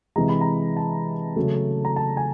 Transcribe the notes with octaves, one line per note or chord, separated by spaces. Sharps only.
C3 E3 G#3 A#5
B5
A#5
A5
C#3 F#3 A3
A#5
A5
G#5